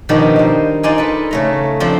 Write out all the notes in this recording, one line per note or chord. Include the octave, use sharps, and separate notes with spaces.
B2 D#3 F3 G3 D4 D#4
D#4 C5
D#4 F4 D5 F5 G#5
A4 B4
C#3 A3 A#5
F3 C4 D4 F4